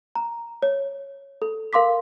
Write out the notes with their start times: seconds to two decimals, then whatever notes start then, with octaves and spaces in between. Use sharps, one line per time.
0.15 A#5
0.63 C#5
1.42 A4
1.73 A#4 F5 C6 D6 B6